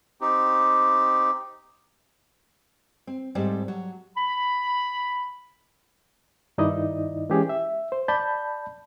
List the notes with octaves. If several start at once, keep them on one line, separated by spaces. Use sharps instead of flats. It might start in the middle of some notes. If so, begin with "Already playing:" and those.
C4 D#4 G4
C4
G#2 G3 C4 A4 D5
F#3
B5
G2 D#3 D#4 E4 D5 D#5
E3 G#3 C#4 G4 G#4
E5
C5
D5 A5 B5 G6